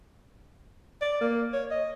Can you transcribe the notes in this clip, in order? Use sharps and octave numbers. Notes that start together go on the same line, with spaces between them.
D5
A#3
C#5
D#5